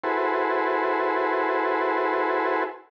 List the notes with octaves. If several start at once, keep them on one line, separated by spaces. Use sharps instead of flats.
E4 F#4 G#4 A4 B4 C5